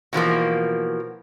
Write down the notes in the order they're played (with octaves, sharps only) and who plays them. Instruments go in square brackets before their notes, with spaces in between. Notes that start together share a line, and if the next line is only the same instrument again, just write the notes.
[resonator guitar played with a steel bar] B2 E3 F3 A#3